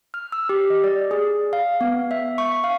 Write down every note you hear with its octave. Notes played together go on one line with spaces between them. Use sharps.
F6
E6
G4
D#5
D5
G#4
F5
B3
E5
C#6
F5